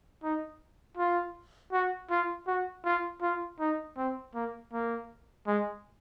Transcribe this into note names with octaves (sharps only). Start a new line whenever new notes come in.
D#4
F4
F#4
F4
F#4
F4
F4
D#4
C4
A#3
A#3
G#3